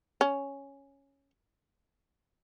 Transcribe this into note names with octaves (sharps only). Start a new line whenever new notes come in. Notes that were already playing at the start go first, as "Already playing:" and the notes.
C#4